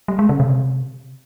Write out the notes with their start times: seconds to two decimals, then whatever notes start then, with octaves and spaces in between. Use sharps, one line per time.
0.08 G3
0.19 G#3
0.29 C#3
0.40 C3